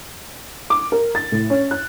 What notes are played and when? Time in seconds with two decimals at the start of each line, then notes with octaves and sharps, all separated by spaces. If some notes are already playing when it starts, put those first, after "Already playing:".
0.70 D6
0.92 A#4
1.15 A6
1.32 A2
1.50 C#4
1.71 F#6